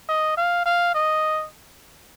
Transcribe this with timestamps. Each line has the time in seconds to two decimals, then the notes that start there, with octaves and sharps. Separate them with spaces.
0.09 D#5
0.37 F5
0.65 F5
0.95 D#5